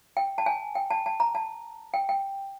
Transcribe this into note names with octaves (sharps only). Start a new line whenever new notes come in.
G5
A5
G#5
G5
A5
A5
A#5
A5
G5
G5